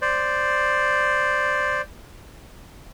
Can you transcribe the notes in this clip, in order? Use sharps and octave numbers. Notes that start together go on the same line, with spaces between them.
C5 D5